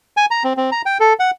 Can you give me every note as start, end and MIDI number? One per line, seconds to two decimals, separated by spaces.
0.17 0.26 80
0.31 0.43 82
0.44 0.53 60
0.57 0.70 60
0.72 0.82 82
0.86 0.98 79
1.00 1.13 69
1.19 1.31 78